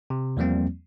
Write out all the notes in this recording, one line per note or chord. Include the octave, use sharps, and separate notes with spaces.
C3
E2 F3 G3 A#3 C4